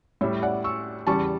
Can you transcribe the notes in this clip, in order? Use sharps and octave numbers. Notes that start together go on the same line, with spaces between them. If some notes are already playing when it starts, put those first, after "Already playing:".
A2 G3 C#5 E5
D5 F#5
C#6 E6
E2 C#3 G3 A5 C#6